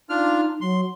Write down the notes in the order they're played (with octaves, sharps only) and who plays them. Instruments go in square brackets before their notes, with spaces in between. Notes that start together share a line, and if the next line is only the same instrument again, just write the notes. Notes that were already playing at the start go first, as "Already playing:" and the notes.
[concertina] D4 F4 F6 [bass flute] D#4
[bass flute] F#3 [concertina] C6